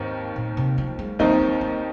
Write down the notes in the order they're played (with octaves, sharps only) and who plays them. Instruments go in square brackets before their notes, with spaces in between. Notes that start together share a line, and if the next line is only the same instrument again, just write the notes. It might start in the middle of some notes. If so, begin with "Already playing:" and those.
Already playing: [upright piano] D#2 D#3 C4 [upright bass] G#2
[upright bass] A#2
C3
F3
G#3
[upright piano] D#2 D#3 C4 D#4 [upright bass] F3
[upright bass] G#3
A#3